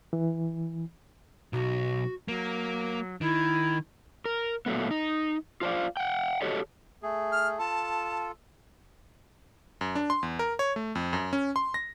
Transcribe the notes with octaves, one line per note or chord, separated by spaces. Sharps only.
E3
B1 F#4
F#3 A#3
D#3 E4
A#4
A#2 F#3 A3 B3
D#4
F4 C5 D5 F5
F#5 G5
F#4 G4 A4 C#5 D#5
A3 G#4
F6
F4 A4 A5
F#2
D4
C6
E2
A#4
C#5
A3
F2
F#2
C#4
C6
A#6